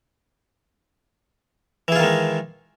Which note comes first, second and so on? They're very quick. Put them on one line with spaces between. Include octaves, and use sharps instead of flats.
E3 G#4 F4 D#3 G#3